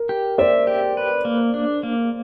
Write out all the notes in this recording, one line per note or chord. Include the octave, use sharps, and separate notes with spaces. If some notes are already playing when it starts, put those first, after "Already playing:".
Already playing: A#4
G4
C5 D5 E5
G4
B4
A#3
D4
A#3